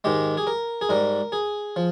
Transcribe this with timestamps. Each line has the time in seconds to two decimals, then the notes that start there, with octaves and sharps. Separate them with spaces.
0.04 G#2 D#3 G#3 G4
0.37 G#4
0.47 A#4
0.81 G#4
0.89 G#2 G3 A#4
1.32 G#4
1.76 F3